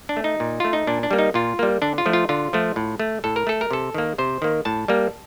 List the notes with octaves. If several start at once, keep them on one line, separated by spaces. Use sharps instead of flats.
D4
A3
D#4
A#2
A3 F4
D#4
A#2 D4
D4
G3 A#3
D#4
A#2 F4
G3 A#3
D3 D4
F4
F3 A3
F4
D3 F4
F3 A3
A2
A3
A2 A4
A#4
A3 A4
A#4
C3 A4
D#3 A#3
C3 C5
D#3 A#3
A2 A5
G3 A#3